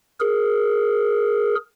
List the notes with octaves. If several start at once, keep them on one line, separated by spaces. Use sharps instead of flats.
G#4 A#4